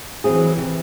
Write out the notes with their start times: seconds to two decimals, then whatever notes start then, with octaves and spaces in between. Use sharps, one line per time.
0.24 E3 F#3 C4 E4 G#4
0.57 C3